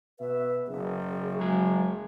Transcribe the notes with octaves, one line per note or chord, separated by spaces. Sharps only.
B2 B4 E5
F#1 G#4
F#3 G#3 G#4